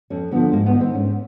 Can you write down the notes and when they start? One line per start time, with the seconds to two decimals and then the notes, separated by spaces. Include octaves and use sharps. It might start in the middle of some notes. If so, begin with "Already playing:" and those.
0.10 F2 C#4
0.31 D3 B3
0.35 F3
0.53 G#2 A#3
0.66 B3
0.73 D#3
0.80 C4
0.94 G#2 C#4